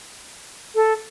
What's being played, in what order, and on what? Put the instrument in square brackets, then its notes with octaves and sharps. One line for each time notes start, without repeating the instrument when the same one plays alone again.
[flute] A4